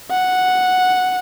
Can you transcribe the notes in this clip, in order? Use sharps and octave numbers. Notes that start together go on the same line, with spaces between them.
F#5